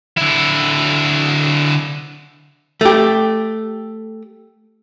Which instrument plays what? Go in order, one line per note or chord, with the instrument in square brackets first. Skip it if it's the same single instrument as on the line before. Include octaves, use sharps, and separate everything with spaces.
[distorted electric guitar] D3 E4
[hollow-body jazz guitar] A3 G4